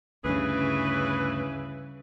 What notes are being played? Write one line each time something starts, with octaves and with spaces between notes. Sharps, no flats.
D2 G2 C#3 E3 G#4 B4